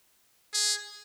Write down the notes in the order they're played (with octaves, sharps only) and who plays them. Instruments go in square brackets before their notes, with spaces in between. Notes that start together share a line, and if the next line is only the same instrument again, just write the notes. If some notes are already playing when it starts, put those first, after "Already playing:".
[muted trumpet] G#4